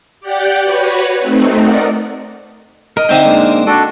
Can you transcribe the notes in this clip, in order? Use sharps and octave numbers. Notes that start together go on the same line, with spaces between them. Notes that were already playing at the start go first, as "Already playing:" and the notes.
G4 D5 F#5 G5 G6
F#4 B4 C#5
A3 C4 D#4
A#4 D5 D#5 F#5
A#4 D#5
D3 C4 D#4 E5 G5
G#3 A#3 D4
D4 F#4 A4 D5